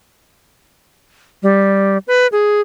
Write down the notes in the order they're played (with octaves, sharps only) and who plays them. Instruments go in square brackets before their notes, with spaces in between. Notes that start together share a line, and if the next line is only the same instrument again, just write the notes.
[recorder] G3
B4
G#4